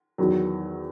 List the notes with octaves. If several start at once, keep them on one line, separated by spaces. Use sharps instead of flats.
E2 D#3 F#3